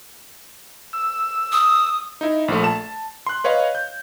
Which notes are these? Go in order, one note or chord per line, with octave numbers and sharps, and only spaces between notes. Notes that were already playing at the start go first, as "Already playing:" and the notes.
E6
D#6
D#4 E4
A#1 A3
A5 E7
C6 F#6
B4 C#5 D#5 F5
G6